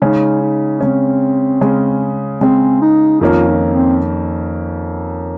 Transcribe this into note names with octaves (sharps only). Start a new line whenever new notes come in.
C#3 G#3 C#4 D#4
D#4
C#3 G#3 C4 C#4
C#3 G#3 C#4
C#3 G#3 C4 C#4
D#4
F2 D#3 A#3 C#4 F4
D#4
C4